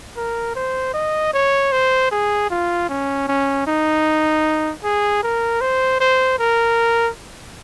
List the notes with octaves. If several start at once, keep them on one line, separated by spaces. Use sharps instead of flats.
A#4
C5
D#5
C#5
C5
G#4
F4
C#4
C#4
D#4
G#4
A#4
C5
C5
A#4